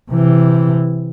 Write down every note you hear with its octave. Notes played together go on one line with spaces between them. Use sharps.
C3 E3